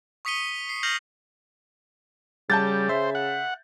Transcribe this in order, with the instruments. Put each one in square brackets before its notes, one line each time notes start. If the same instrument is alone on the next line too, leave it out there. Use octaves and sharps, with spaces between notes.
[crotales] C#6 D#6 B6 C#7 D#7 G7
C7
F6 G6 A#6 C7 F7 F#7
[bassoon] C#3 [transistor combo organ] G3 [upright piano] A5 G6 A6
[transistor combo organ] C5 [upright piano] E5
[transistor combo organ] F#5